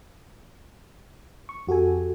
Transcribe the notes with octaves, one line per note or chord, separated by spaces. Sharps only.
C#6
F2 F#4 G4 A4 G#5